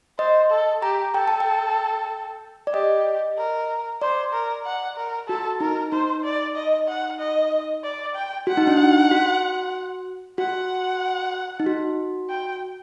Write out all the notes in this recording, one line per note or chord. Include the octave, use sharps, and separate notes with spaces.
C5 D#5
A4
G4 A#5
A4 G5
A5
G5
D5
G4 D#5
A#4
C5 D5
A#4
F#5
A#4
F#4 A4
D#4 A#4
D#4 C5
D5
D#5
F#5
D#5
D5
G5
F#4 F#5
D#4
D4
D#4
F#4
F#4 F#5
D#4
F#4
G5